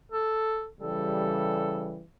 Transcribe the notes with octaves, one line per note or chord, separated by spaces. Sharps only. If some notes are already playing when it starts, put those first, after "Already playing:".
A4
C#3 E3 G3 A4